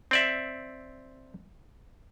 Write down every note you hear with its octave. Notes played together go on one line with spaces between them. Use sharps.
C4 D5 E5